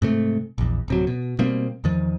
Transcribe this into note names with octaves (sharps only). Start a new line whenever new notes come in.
G#2 C3 A3
A#1 E2
D1 C3 F#3
B2
B2 G3 A#3 C4
E2 D#3 F3